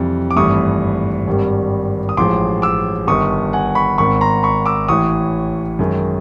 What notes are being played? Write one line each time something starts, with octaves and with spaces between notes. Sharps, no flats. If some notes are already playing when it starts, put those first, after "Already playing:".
Already playing: F2 C3 E3 G3
D6
G#1 G2 E3 A3 C#6 D#6
G#1 G2 D#3 G3
D#6
A1 A2 F3 G#3 C6 D6
D6 E6
G1 G2 D#3 C#6 D#6
F#5 G#5
B5 C#6
G#1 G#2 D#3 B5 C#6
A#5 C6
B5 C#6
D6 E6
A1 A2 E3 C#6 D#6
F#2 D#3 G#3